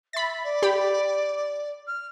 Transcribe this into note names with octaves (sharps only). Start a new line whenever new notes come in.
E5 B5 A6
D5
G4 B5
F6